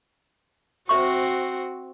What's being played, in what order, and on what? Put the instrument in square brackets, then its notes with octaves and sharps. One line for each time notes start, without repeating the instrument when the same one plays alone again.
[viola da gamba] C4 F#4 [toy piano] C5 E5 C#6